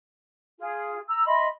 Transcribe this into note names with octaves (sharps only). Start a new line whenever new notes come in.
F4 G#4
A#5 E6
D#5 E5 B5 C6